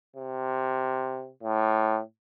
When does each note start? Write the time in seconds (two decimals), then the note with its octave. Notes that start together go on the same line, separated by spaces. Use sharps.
0.16 C3
1.43 A2